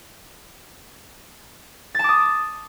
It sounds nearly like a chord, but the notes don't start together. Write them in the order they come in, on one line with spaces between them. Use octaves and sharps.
A6 A5 D6 D#6